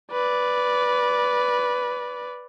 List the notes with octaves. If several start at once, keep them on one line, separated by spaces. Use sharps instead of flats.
B4 D5